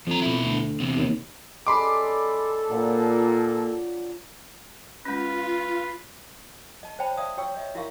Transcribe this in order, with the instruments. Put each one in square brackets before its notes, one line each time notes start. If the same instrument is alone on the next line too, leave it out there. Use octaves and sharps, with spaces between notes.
[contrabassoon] F2 [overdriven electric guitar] F3 A#5
[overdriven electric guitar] B2 E4
[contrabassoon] D2
[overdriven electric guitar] E2 C3
[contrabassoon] D#2
[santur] G3 G#3 C#4 [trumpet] A4 [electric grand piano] B5 C6 D6
[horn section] A#2 [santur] F3 F#3 D4
[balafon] G#3 C#4 [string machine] F4 [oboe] B4
[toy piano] D#5 A5
C5 C#5 G5 A5 B5
D5 E5 F5 A5 D#6
F#4 C#5 G5 C#6 E6
C#5 D#5 E5
E4 F#4 A#4 E5 F5 C#6